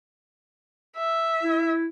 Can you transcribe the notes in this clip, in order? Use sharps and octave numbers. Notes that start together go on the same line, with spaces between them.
E5
E4